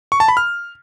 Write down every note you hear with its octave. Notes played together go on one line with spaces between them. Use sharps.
C#6
A5
B5
F6